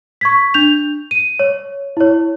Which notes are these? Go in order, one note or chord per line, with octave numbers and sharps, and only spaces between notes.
C#6 G#6 B6
D4 G6 F7
D#7
C#5
E4 C#5